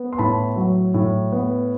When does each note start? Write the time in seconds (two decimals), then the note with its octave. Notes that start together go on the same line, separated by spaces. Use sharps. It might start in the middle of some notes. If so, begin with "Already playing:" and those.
Already playing: B3
0.13 C6
0.18 A2 A5 B5
0.56 F#3
0.94 A2
1.32 B3